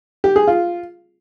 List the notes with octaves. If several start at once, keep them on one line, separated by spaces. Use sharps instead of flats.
G4
G#4
F4